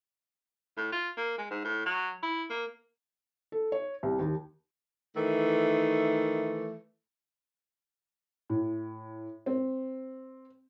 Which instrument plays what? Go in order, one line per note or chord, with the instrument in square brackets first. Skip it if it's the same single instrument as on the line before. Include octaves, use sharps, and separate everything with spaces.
[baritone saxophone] A2
F4
A#3
G#3
G#2
A2
F#3
E4
A#3
[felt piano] A4
C#5
C2
D#2
[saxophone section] D#3 E3 A3
[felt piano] A2
C4